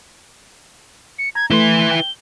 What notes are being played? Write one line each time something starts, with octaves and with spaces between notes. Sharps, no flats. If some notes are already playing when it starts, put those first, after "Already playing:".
C#7
A#5 G#6
E3 A3 E4 B4 C6 G7
G5